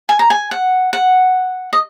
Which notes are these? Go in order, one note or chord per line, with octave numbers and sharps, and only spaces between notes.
G#5
A#5
G#5
F#5
F#5
D#5